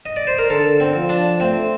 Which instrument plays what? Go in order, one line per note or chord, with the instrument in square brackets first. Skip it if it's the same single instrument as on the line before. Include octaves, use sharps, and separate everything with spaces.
[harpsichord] D#5
D5
C5
A#4
[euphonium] D3 [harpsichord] A4
[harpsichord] C4
[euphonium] F3
[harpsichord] D4
[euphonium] A3 [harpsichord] C4